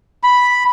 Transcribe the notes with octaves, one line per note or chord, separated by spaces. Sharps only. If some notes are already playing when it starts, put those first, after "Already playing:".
B5